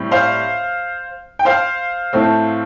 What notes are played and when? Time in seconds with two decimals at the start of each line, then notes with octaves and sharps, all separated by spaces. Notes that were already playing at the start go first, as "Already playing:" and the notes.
Already playing: A2 G3 C4
0.11 C5 F5
1.39 G5
1.45 C5 F5
2.13 A2 A3 C4